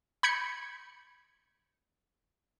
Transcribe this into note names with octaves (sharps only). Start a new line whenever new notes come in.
B5 G6 G#6 C#7